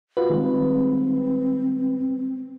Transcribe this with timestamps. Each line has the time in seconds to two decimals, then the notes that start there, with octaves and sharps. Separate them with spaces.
0.17 F4 F#4 B4
0.30 D#3 G3 G#3 C4